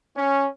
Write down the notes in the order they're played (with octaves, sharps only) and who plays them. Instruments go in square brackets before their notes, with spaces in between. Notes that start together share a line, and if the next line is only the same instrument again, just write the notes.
[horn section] C#4